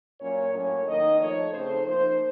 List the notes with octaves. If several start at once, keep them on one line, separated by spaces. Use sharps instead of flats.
A#2 F#3 A#3 C#4 C#5
A2 F#3 A#3 C#4 C#5
D#3 A#3 D#4 D#5
F3 A3 D#4 C#5
C#3 A3 C4 D#4 C5
F3 A#3 D#4 C5